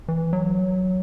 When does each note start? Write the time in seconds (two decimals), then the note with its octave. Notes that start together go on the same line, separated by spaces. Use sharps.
0.08 E3
0.33 F#3